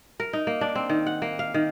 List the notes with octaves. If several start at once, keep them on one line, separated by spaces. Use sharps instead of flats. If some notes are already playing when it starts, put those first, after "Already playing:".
A#4
D#4
A#3
D4
C4
D#3
F#5
A#3
F5
D#3